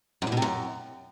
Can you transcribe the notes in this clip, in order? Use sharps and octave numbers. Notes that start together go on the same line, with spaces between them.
F#2
E2
B2
C3
F#2